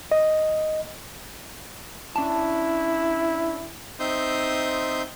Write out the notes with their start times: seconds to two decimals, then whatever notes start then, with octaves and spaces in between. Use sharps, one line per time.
0.12 D#5
2.16 C#4 D4 E4 A5
4.00 C4 D#4 E5 C6 D#6 G6